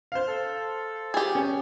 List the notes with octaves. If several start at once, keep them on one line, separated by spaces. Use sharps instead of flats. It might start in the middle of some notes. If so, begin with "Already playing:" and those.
C5 F5
A4
G4 G#4
C#4